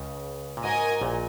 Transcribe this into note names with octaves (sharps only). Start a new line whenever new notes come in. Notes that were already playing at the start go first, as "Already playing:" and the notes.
Already playing: C#2 C#3
A#2
G#2 F#4 A#4 D#5 G#5
A#1 A#2